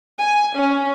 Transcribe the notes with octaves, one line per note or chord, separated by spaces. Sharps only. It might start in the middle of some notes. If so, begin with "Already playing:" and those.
G#5
C#4